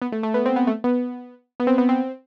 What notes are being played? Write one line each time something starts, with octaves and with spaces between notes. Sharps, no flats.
B3
A3
A3
B3
C4
B3
A3
B3
B3
C4
B3
C4